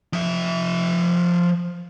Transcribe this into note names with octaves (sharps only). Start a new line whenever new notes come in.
F3 E5